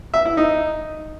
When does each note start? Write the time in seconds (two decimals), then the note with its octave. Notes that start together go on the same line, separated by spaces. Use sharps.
0.14 E5
0.25 E4
0.37 D#4